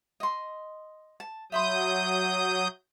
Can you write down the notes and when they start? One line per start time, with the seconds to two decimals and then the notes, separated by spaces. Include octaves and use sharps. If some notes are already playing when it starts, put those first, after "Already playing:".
0.20 D#5 C6
1.20 A5
1.52 F#3 E5 B5 C6 D#6 G6